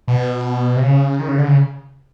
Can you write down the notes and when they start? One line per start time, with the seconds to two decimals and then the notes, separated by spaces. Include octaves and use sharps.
0.08 B2
0.76 C3
0.82 C#3
1.20 D#3
1.28 C#3
1.38 D3
1.48 C#3